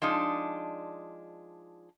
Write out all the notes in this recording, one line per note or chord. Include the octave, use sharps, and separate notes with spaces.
F3 G#3 D4 D#4